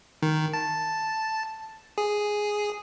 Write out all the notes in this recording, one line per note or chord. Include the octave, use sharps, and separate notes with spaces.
D#3
A5
G#4